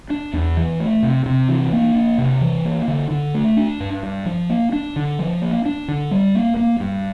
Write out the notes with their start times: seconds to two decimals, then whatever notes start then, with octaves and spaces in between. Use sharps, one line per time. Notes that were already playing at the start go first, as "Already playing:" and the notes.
0.10 D4
0.33 E2
0.57 E3
0.80 A3
1.03 C3
1.26 C3
1.49 E3
1.73 A#3
1.95 D4
2.18 C3
2.41 E3
2.65 A#3
2.88 D3
3.11 D3
3.34 A3
3.57 D4
3.80 G2
4.03 G2
4.26 F3
4.49 A#3
4.72 D4
4.96 D3
5.19 F3
5.42 A#3
5.65 D4
5.88 D3
6.11 G3
6.35 A#3
6.57 A#3
6.80 G2